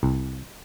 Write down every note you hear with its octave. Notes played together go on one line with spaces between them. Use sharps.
C2